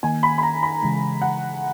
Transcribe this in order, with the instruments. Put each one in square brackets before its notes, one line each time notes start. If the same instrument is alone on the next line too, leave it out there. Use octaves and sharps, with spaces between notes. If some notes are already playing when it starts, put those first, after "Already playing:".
[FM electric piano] D#3 A#3 D#4 [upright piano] G#5
[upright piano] B5
B5
A#5
B5
[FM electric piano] C#3 E3 G#3
[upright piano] F#5